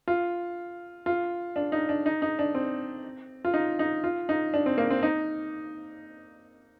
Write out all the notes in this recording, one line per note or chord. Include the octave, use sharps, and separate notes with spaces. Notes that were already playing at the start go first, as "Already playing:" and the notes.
F4
F4
D4
D#4
D4
D#4
D#4
D4
C4
F4
D#4
D#4
F4
D#4
D4
C4
A#3
C4
D#4